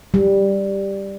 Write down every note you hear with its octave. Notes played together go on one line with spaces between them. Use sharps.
G3